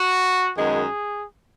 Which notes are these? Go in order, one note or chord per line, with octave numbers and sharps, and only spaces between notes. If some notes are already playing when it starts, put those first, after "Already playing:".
Already playing: F#4
F#2 D#3 G#3 B3 G#4